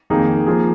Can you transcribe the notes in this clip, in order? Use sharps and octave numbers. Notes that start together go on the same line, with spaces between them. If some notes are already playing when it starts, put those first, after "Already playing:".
F2 D#3 A#3 D#4 G#4
F3 A#3 F4 G#4